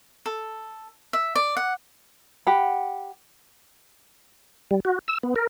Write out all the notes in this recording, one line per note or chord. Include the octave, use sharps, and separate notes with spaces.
A4
E5
D5
F#5
G4 F#5 B5
G3
F#4
E6
B3
A#4